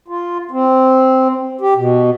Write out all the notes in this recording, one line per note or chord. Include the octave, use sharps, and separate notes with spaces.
F4
C4
G4
B2